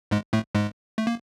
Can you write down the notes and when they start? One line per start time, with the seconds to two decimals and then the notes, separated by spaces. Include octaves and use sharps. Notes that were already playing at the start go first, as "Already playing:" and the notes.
0.11 G#2 G#3
0.33 A2 A3
0.55 G#2 G#3
0.98 A3
1.07 A#3